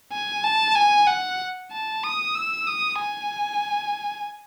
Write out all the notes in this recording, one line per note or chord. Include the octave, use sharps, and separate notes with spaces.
G#5
A5
G#5
F#5
A5
D#6
E6
D#6
G#5